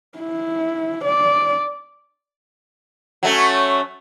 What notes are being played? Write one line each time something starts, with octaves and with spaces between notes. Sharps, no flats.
E4
D5
F#3 A3 C#4